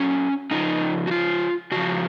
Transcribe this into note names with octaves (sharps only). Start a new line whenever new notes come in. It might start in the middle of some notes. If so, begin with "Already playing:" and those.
Already playing: A#2 F#3 C#4
C#3 F3 D#4
F#4
F4
C#3 F3 F#4